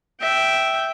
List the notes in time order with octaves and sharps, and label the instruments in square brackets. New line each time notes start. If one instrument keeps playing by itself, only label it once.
[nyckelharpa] E5 G5